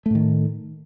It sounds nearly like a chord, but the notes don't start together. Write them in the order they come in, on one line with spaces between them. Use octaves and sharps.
A3 A2 D#3